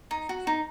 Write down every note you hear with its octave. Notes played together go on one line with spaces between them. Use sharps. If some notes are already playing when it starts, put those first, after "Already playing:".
D#4
F#4
D#4